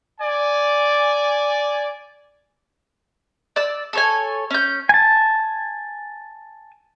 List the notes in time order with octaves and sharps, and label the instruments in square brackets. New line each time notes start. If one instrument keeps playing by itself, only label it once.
[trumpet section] D5 G#5
[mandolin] D5 E6
A4 C#5 G#5
C#4 G6
[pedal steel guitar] G#5 A5